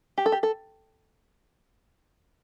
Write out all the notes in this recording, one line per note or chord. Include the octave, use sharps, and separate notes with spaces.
G4
A4
G4
A4